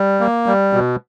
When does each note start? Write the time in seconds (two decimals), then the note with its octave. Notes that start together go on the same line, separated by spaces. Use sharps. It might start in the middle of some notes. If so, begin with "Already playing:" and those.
Already playing: G3
0.20 A#3
0.46 G3
0.73 B2